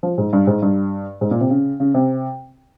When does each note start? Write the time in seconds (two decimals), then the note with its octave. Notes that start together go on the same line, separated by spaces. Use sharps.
0.03 F3
0.18 G#2
0.33 G2
0.47 G#2
0.62 G2
1.21 G#2
1.31 A#2
1.41 C3
1.50 C#3
1.80 C#3
1.94 C3